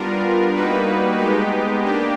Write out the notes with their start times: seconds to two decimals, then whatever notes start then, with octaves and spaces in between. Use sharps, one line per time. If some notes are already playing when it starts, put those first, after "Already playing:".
Already playing: G3 B3 D4 F4 A#4
0.54 G3 A#3 D#4 F#4 B4
1.17 G#3 B3 D#4 G4
1.81 A#3 D4 G4